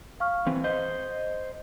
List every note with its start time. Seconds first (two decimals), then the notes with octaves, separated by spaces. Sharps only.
0.20 F5 C#6 F6
0.46 E3 C4
0.64 C5 D#5 G6